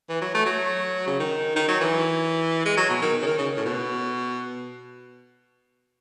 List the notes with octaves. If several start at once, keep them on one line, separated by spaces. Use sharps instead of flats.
E3
F#3
A3
F#3
C#3
D#3
D#3
F#3
E3
G#3
F#3
B2
D#3
C#3
D#3
C#3
A2
B2